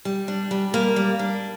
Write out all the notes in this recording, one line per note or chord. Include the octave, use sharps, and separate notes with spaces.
G3
D4
G3
A#3
G3
D4